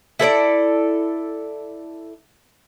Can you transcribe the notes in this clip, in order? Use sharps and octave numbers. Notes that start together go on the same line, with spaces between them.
E4 A4 B4 D5